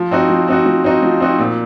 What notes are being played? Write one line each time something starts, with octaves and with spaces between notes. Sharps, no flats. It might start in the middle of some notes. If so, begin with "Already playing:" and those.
Already playing: F3
C4 D#4 F#4
F3
C4 D#4 F#4
F3
C4 D#4 F#4
F3
C4 D#4 F#4
A#2